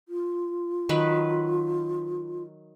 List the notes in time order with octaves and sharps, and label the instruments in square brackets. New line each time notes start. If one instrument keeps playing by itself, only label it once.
[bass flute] F4
[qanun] D#3 F#3 B4